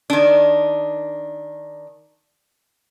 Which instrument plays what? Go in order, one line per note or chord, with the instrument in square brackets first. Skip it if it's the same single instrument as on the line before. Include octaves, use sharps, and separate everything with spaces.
[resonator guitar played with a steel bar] D#3 D4